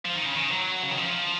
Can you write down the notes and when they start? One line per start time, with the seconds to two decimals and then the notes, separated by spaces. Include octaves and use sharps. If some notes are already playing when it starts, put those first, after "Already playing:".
0.05 F3
0.15 D#3
0.26 C#3
0.36 D#3
0.51 F#3
0.83 C#3
0.91 D#3
0.98 F3